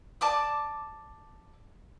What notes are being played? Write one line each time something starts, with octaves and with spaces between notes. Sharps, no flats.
D5 A5 D6 D#6